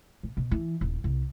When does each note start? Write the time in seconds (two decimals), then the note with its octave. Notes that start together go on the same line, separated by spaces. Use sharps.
0.23 A#2
0.37 B2
0.51 E3
0.81 D#1
1.04 C2